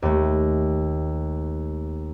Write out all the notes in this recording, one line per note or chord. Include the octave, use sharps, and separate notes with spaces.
D#2 A3